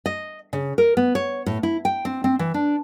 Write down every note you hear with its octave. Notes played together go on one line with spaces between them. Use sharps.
D#5
C#3
A#4
B3
C#5
A2
E4
G5
C4
C4
E3
D4